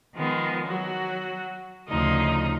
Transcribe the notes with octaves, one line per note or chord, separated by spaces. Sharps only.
D#3 F3 G#3 B3
F#3 F#4
D2 C#3 F3 D#4 D#5